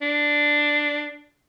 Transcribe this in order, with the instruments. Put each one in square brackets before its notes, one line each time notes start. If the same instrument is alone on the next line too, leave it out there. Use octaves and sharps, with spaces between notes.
[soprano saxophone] D4